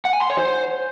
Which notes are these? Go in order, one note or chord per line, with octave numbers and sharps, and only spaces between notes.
F#5
G#5
C6
C#5
C5